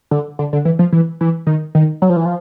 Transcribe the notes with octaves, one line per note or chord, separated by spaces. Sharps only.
D3
D3
D3
E3
F3
E3
E3
D#3
D#3
F#3
F3
E3
F3